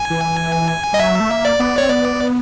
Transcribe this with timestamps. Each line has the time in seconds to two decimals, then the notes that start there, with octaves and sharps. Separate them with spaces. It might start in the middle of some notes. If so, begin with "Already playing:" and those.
Already playing: G#5
0.10 E3
0.93 G3 D#5
1.00 F#3 E5
1.20 A3
1.30 A#3
1.45 D5
1.59 B3
1.78 C4 C#5
1.89 B3 D5